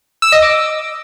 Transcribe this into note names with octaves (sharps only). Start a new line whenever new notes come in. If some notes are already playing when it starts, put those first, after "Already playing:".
E6
D#5
D6